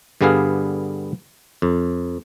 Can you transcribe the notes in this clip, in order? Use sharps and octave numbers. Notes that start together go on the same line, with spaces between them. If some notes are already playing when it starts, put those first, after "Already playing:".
G2 D3 G3 B3 G#4 F5
F2